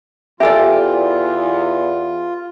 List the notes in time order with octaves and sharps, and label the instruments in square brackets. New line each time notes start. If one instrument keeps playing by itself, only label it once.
[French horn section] E2 [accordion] F4 [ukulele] G4 A4 D5 [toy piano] E5 G#5